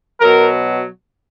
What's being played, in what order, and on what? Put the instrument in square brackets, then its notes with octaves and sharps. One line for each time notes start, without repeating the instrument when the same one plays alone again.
[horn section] B2 F#3 A#4